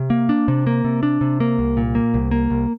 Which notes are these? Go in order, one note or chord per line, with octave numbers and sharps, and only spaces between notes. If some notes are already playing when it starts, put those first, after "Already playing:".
Already playing: C3
A#3
D4
C3
A#3
C3
D4
C3
A#3
C2
A#2
A#3
C2
A#3
C2